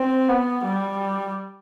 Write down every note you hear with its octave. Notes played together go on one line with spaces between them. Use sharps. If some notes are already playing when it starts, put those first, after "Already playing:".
Already playing: C4
B3
G3